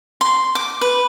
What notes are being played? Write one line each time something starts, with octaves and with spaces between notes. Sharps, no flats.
C6
D6
B4